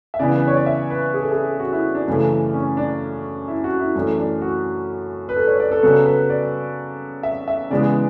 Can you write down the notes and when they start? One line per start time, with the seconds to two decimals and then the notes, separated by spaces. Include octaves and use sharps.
0.14 E5
0.19 C#3 E3 B3 D5
0.38 B4
0.48 C#5
0.57 D5
0.66 E5
0.90 B4
1.14 G#4
1.22 A4
1.32 G#4
1.60 F#4
1.73 E4
1.95 D4
2.08 F#2 C#3 E3 A3
2.54 C#4
2.77 D4
3.48 E4
3.64 F#4
3.79 E4
3.96 F#2 E3 A3 D4
4.18 D4
4.42 F#4
5.29 B4
5.36 A4
5.48 C#5
5.60 D5
5.71 A4
5.83 C#3 F#3 B3 A4
6.06 B4
6.30 D5
7.23 E5
7.48 E5
7.70 C#3 E3 G#3 B3 D5